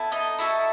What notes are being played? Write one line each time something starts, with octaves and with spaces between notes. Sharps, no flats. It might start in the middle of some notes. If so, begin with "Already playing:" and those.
Already playing: B3 E4 A4
D#4 D#5
D#4 E4 F#4 A4 E5